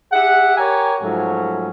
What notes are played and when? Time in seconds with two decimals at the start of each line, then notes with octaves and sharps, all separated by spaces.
0.12 G4 G#4 E5 F#5
0.58 G4 A#4 C#5 G#5 A#5
1.02 G#2 F3 F#3 A3 C#4